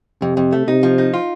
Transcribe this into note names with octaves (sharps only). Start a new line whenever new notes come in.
F2 C3
F2
A3
C3 D#4
F3
D#4
F4